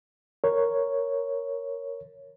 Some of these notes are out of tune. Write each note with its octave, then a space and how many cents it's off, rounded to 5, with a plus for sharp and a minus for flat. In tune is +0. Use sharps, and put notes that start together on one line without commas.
A#4 +0 C#5 +0